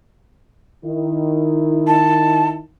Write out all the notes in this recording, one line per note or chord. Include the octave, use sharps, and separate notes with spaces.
D#3 E4
A5